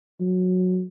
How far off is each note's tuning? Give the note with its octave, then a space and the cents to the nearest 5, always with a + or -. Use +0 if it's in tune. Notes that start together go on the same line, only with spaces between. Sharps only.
F#3 -15